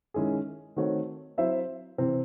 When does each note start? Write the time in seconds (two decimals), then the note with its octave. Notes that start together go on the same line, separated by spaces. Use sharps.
0.14 D#3 G#3 C#4 E4 G#4
0.76 D#3 A3 C4 F#4 C#5
1.37 F#3 C4 E4 C5 E5
1.98 C3 E3 C4